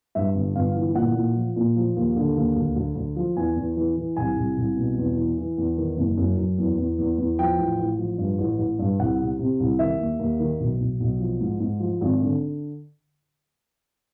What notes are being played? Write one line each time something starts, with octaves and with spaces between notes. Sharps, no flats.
G2 E5
G1
G1 F5
E3
A#2 F#5
A#2
F3
A#2
F3
D#2
D3
D#2
D2
D2
D2
F3
E2 G#5
E2
E3
E3
C2 G#5
C2
C2
B2
E2
E3
E3
E2
D#3
F#1
F#2
F#2
E2
E2
E2
E2
F3 G5
A1
A1
F3
G2
A1
A1
G2
C2 F#5
C3
C3
C2
D#3 E5
D#2
D#2
D#3
B1
B1
B1
F3
G#2
G#2
F3
G#1
D3